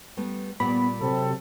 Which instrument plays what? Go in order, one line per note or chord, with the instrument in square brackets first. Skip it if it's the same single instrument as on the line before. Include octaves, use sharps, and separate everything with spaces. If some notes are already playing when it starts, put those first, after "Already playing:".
[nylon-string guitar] G3 A3 B3
[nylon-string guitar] A#2 G3 G4 [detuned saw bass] B3 [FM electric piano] B5
[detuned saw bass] C3 [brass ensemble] F#3 C4 A4